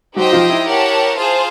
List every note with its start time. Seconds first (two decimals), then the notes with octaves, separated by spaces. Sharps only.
0.16 F#3 D#4 F#4 G4 C5 D#5 G5
0.33 F3 F4
0.50 E4
0.66 G4 A#4 C#5 F#5 A5
1.17 F4 G#4 C5 F5 A5